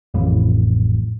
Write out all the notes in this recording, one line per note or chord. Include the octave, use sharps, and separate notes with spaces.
A1 F2 A2